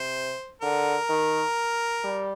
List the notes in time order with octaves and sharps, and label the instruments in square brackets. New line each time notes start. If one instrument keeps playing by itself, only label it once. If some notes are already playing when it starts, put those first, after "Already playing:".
Already playing: [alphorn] C3 [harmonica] C5
[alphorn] D3 [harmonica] A#4
[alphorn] D#3
G3